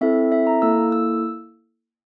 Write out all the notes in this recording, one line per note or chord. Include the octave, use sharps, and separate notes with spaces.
C4 E4 A4 E5
E5
A#5
A#3 E4 A4 E6
E6